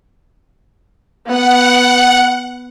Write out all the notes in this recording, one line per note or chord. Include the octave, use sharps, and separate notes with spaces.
B3 F#5